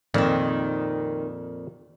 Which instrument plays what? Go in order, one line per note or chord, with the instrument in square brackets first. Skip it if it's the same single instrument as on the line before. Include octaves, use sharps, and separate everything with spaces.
[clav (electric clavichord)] F2 A#2 [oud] D#3 C4